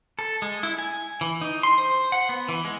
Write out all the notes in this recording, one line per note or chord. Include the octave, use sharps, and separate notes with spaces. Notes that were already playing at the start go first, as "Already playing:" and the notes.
A4
G#3
E4
G#5
E3
D#4
C6
C5
F#5
B3
E3
G#3